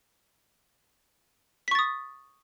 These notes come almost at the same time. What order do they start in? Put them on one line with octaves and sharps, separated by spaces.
B6 C#6 A6 D#6